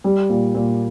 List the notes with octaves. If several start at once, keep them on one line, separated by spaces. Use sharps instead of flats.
G3
A#2
A#2